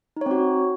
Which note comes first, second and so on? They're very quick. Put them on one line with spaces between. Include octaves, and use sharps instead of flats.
D#4 C#5 C4 F#4